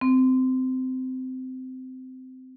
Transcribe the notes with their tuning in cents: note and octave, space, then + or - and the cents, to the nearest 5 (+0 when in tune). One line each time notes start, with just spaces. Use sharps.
C4 -20